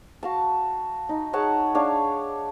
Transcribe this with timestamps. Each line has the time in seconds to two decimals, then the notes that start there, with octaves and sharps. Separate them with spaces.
0.23 F#4 F5 A5
1.09 D#4
1.33 G#4 C#5 F#5 A5
1.75 D4 C#5 F5